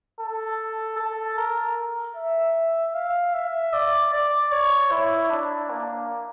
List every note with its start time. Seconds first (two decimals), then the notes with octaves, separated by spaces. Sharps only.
0.20 A4
0.99 A4
1.38 A#4
2.16 E5
2.94 F5
3.34 E5
3.73 D5
4.13 D5
4.52 C#5
4.91 E4
5.30 D4
5.70 A#3